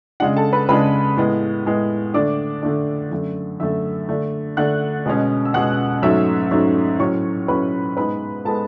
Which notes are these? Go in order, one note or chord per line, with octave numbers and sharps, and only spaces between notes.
C#3 G#3 D4 F#5
A4 A5
B4 B5
C#3 G#3 D4 B4 B5
A2 G#3 B3
A2 G#3 B3
D3 A3 D4 D5 D6
D3 A3 D4
F#2 D3 A3
F#2 D3 A3 E5 E6
D3 A3 D4
D3 A3 D4 F#5 F#6
B2 G#3 C#4
E6
B2 G#3 C#4 F#5 F#6
G#2 F#3 A3 C#4 E5 E6
G#2 F#3 A3 C#4
A2 F#3 C#4 C#5 C#6
A2 F#3 C#4 B4 B5
G#2 G#3 B3 B4 B5
G#3 B3 A4 A5